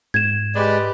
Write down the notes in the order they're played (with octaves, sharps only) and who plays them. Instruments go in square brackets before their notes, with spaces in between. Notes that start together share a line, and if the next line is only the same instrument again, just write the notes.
[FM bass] G#2 [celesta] G#6 E7
[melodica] G#3 D5 [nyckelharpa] G4 B4